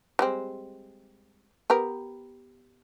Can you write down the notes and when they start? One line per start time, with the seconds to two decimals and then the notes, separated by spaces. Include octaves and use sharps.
0.19 G3 G#3 C4
1.70 B3 G4 A#4